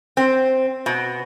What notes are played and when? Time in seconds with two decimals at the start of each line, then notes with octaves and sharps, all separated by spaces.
0.17 C4
0.86 B2